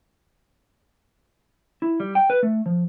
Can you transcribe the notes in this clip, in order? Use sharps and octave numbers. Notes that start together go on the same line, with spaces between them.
E4
G3
G5
B4
A3
F3